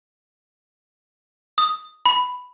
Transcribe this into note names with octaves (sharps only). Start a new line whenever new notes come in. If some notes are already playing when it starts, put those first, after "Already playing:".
D#6
B5